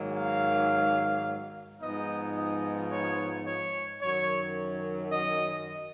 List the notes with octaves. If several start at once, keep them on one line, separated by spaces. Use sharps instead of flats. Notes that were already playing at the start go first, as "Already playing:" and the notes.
Already playing: G#2 D#3 F#3 A#3
F5
G#2 F3 B3 D#4 D#5
D#5
C#5
C#5
F#2 D#3 F#3 C#5
D#5